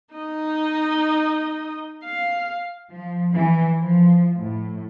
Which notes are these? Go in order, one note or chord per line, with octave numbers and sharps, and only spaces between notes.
D#4 D#5
F5
F3
E3
F3
A2